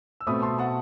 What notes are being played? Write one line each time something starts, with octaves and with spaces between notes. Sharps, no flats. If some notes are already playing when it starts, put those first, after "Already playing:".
E6
B2 A3 C4 B5 D#6
A5 C6
F#5 A5